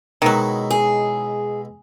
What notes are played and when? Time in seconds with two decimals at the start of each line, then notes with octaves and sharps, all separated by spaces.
0.22 B2 D#3 F#3 G#3 E4
0.70 G#4